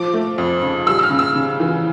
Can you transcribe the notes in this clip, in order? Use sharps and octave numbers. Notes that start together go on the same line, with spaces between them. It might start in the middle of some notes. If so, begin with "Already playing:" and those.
Already playing: F3 D6
A3
F2
C#3
G3 E6
E6
F6
C#3
E6
C#3
E3